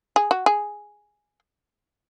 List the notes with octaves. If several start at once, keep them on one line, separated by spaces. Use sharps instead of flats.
G#4
F#4
G#4